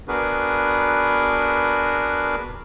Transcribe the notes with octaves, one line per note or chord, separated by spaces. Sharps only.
B3 D4 F#4 G#4 A#4 B4